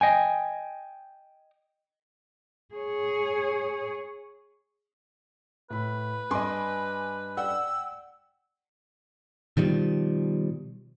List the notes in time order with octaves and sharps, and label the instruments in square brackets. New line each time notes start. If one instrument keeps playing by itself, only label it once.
[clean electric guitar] D#5 G5 G#5
[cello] G#4 C#5
[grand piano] A2 B5 [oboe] B4
[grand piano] G2 D#5 [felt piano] G#5 C6 D6
[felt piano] D5 F#5 G5 [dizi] E6
[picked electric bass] B2 D#3 F3 G3